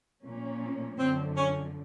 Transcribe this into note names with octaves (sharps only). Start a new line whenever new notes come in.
A#2 F3 A#3 C#4
F#2 D3 F3 C4
C#4